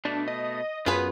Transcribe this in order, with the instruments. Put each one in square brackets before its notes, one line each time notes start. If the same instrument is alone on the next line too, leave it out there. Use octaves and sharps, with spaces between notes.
[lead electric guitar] B2 A3 [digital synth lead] D4
[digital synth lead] D#5
[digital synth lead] F#2 [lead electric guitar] B3 [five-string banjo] F4 G#4 B4